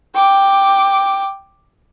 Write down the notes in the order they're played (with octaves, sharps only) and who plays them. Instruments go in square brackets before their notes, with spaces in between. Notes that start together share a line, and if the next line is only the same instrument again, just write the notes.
[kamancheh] G5 D6